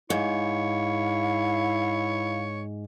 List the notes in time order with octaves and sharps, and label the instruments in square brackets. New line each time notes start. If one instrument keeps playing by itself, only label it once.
[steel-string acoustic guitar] G#2 [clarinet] E4 [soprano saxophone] C#5 [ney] F5